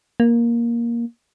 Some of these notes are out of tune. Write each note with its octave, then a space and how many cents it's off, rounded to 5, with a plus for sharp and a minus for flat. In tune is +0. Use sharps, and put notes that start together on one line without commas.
A#3 +10